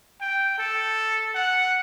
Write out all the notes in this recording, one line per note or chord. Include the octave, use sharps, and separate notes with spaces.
G5
A4
F#5